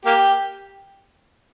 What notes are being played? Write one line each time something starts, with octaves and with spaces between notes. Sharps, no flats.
A#3 G4